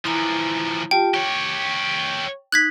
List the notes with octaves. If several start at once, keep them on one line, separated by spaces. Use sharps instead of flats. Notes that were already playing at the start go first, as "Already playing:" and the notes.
E3 F3 E4 A#5
F4 G4 G5 A5
G4 C#5 C#6
D#4 F#6 G#6 B6